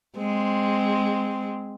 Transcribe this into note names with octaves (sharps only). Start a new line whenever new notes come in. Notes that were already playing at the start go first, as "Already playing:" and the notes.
G#3 C4